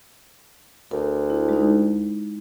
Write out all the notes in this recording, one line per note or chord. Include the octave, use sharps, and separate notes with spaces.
D2 A#4
E4
G#3 D#4